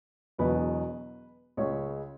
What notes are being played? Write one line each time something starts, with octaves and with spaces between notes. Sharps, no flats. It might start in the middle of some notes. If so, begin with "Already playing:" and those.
E1 E2 B2 F#3 B4
C#2 C#3 G#3 C#5